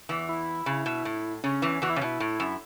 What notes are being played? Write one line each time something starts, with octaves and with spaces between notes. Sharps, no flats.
E2 E3
E4
C#3
B2
A2
C#3 C#4
E2 E3
E2 E3 F#4
E4
C#3 C#4
B2 E4
A2
F#2